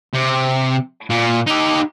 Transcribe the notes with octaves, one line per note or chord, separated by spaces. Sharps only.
C3
A#2
D#4 G4